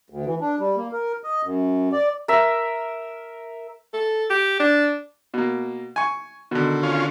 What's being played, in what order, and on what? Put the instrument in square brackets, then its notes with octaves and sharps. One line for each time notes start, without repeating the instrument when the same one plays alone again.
[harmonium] D2
E3
D4
G3
A#3
A#4
D#5
F#2
D5
[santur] A#4 E5
[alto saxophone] A4
G4
D4
[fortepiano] B2 A#3
G#5 C#6
[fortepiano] B2 [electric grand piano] D3 D#3
[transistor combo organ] C#4 F4